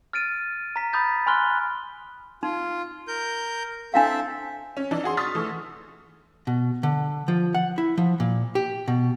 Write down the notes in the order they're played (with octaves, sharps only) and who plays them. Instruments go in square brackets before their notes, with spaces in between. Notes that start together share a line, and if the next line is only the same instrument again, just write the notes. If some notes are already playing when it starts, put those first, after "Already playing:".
[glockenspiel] F6 A6 D7 D#7
A#5 B6
B5 D#6 G6 A6
G#5 B5 C6 F6 F#6 G7
[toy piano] D#4 [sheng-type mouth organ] F4
[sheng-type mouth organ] A#4 G6
[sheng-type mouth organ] C4 A4 E5 [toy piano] D4 E4 F5
[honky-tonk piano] C#4
E3 D4 D#4
F#4 G#4 C6
C6 C#6 D#6 F6 A6 B6
E3 A3
[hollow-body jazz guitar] B2
D3
F3
F#5
E4
F3
A#2
G4
B2